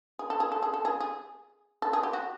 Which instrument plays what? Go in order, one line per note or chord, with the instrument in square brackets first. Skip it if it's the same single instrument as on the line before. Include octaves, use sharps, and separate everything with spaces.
[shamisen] G#4
A4
G#4
A4
G#4
A4
G#4
G#4
A4
G#4
G4
F#4